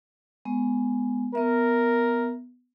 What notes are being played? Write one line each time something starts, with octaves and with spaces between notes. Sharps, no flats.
G#3 B3
B3 A#4 E5